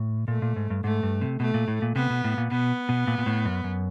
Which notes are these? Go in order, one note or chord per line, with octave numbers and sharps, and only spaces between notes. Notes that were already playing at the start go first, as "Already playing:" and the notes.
Already playing: A2
A#2 A3
A#2
G#2
G2
G#2 A3
G2
C3
B2 A3
A#2
A2
A#2
C3 B3
B2
A2
A#2
B2 B3
B2
A#2
A#2
A2
F#2
F#2